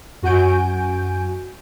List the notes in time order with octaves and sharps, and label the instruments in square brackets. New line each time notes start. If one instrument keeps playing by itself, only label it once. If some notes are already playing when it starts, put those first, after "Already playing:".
[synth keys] F#2 F#4 F#5 G#5 G6 D7